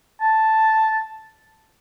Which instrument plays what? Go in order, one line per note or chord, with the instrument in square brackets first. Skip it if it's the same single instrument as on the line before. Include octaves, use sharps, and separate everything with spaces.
[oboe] A5